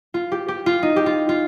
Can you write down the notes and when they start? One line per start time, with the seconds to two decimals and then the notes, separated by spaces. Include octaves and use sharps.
0.14 F4
0.32 G4
0.48 G4
0.66 F4
0.83 D#4
0.96 G4
1.06 F4
1.29 F4